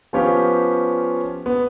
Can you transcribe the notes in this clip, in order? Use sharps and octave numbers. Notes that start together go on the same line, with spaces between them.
F3 B3 C#4 F4 G4
B3